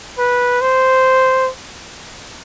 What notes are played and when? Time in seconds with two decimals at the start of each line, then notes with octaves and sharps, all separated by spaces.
0.19 B4
0.61 C5